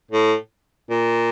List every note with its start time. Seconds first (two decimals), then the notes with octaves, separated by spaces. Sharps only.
0.11 A2
0.90 A#2